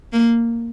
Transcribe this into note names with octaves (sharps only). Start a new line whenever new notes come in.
A#3